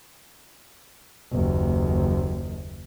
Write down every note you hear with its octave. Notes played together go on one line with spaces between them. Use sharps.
F#1 D#2